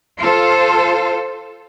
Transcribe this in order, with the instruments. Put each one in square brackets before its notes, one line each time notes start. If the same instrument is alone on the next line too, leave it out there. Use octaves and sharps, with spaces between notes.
[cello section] F4 A4 C5